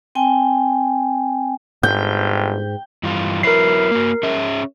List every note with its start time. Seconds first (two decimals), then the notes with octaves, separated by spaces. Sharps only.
0.15 C4 G5 G#5
1.83 G1 G#2 G5
3.03 G2 E3 F4
3.43 F#3 E4 A#4 B4 C7
3.91 A#3 F#4
4.23 C#4 G#4 E5